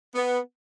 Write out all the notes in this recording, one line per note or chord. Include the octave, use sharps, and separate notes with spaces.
B3